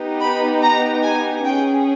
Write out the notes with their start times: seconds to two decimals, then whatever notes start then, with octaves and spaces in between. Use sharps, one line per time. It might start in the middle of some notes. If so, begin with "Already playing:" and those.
Already playing: B3 D#4 G4
0.20 B5
0.62 A#5
1.03 G#5
1.45 C#4 G#4 G5